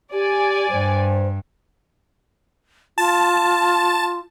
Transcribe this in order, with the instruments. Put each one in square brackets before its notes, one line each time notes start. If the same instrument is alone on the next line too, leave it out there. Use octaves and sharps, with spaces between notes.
[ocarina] G4 [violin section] D5 G#5
[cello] G2 [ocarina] C5
[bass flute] F4 [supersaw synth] A5